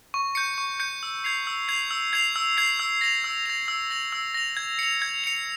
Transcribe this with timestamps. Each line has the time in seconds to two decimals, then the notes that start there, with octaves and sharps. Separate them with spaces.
0.14 C#6
0.35 G6 C#7
0.58 C#6
0.80 G6 C#7
1.03 E6
1.24 G#6 C7 F7
1.47 E6
1.68 G#6 C7 F7
1.91 E6
2.13 G#6 C7 F7
2.36 E6
2.57 G#6 C7 F7
2.79 E6
3.01 A#6 F7
3.24 E6
3.46 A#6 F7
3.68 E6
3.91 A#6 F7
4.12 E6
4.34 A#6 F7
4.57 G#6
4.79 C#7 F7
5.02 G#6
5.24 C#7 F7